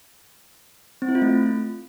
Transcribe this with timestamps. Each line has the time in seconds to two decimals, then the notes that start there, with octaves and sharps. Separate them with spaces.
1.02 C4
1.09 E4
1.15 F4
1.22 A3